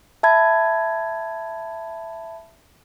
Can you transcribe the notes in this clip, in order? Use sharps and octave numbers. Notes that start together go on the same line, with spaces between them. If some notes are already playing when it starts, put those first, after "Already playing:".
E5 A5 B5 G#6